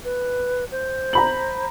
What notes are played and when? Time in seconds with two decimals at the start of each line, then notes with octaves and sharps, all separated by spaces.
0.05 B4
0.72 C5
1.13 A#5 B5 F#7